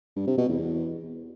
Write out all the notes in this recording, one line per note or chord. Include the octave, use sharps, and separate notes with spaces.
G2
C3
B2
E2